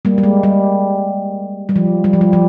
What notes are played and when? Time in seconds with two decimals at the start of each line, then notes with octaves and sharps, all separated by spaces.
0.05 G3 A#3
0.18 G3
0.23 G#3
0.43 G3
1.69 G3
1.76 F3
2.04 G3
2.13 F3
2.21 G3
2.33 F3